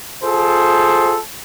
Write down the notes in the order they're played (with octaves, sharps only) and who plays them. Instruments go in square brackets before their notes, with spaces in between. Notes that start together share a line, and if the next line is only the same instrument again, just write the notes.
[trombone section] F4 G#4 A4 C5